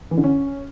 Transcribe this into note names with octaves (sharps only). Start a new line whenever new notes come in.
E3
D3
C#4